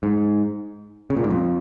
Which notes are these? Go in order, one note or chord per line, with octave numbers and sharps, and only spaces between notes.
G#2
C#3
A#2
G#2
F2